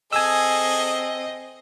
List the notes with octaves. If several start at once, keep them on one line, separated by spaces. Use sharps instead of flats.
C4 G#4 A4 D#5 G#5 E6